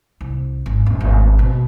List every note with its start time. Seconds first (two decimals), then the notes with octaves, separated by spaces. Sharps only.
0.21 C2
0.66 G#1
0.86 D#1
1.00 G#1
1.39 B2